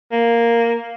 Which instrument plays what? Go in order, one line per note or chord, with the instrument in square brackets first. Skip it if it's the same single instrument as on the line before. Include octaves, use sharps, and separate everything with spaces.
[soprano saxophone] A#3